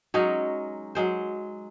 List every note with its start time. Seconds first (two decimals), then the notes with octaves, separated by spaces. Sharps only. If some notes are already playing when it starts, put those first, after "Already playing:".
0.14 F#3 G#3 C#4 D#4
0.95 F#3 G#3 C5